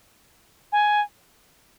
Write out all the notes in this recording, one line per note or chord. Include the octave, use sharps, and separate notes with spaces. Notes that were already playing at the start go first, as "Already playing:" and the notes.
G#5